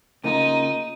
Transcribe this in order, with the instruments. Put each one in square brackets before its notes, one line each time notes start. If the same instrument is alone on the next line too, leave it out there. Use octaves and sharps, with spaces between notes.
[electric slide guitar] C#3 A#3 F4 [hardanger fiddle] D#4 [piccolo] D#7